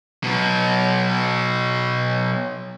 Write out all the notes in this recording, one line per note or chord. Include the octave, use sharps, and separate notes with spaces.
B2 F#3